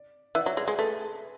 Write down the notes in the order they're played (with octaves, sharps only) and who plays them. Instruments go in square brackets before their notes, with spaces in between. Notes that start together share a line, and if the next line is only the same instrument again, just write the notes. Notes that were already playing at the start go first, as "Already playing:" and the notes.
Already playing: [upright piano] D5
[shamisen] E3 [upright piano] D5 F#5
[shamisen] F#3 [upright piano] C#5 E5
[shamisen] G#3 [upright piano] B4 D5
[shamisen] G#3 [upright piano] G#4 B4
[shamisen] A3 [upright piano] G#4 B4